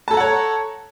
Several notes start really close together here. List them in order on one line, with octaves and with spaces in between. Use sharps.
A5 A4 A#5 F#5 C#5